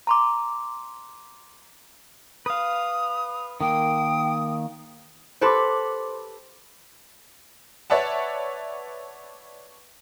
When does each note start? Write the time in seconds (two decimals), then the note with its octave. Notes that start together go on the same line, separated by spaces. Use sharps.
0.07 A#5 C6 D6
2.46 B4 F5 D#6
3.61 D#3 A#3 G5 D#6
5.41 G4 A4 B4 C5 C6 D6
7.90 B4 C#5 D5 E5 F#5 A5